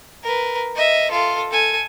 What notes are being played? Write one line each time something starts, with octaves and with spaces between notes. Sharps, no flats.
A#4 B4
D#5 E5
F4 A4
A4 G#5